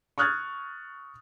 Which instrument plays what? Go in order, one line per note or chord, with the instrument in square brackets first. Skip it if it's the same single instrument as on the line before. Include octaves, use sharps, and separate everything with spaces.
[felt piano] C#6 D#6 F6 F#6 G#6 A6